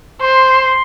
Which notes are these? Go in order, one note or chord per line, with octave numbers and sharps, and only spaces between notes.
C5 C6